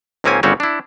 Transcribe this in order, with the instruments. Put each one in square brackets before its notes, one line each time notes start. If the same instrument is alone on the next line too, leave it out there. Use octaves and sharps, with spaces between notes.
[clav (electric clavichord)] C#2 G#2 A#3 C4 C#4 G#5
G1 C#3 G3 C4 F#4 C#5
D4 E4